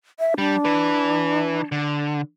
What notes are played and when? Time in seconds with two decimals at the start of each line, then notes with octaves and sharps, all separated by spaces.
0.19 E5
0.38 G3 D4
0.65 E3 B4
1.72 D3